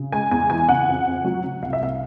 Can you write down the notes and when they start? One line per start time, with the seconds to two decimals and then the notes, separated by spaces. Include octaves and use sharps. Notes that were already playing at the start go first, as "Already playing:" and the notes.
Already playing: C#3
0.12 G#3 G#5
0.31 E2 G#5
0.50 E3 G#5
0.69 C#3 F#5
0.88 F2
1.06 F2
1.25 F#3
1.44 C#3
1.62 C2 F5
1.73 E5
1.81 C2 F5